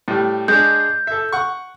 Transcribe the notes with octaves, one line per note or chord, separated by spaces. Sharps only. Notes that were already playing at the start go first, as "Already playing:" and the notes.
A2 G3
G#3 D4 G6
A4 E5
F#5 C#6